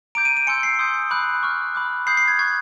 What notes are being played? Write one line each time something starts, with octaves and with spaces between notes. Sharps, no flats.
A#5 D6 G6 D7
D#7
D#7
G#5 C6 E6 G6 C#7
C7
C6 D#6 G6
B5 D6 F#6
C#6 F6
B5 D6 F#6
B5 D#6 G6 C7
C7
G#6
C#6 F#6 G#6